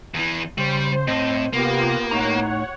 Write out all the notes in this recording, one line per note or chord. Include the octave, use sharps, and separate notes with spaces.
E2 E3
C#3 G3 C5
A2 C4 D#5
C3 A#3 B3 F4 G4
A2 D#4 C#5 F#5 A#5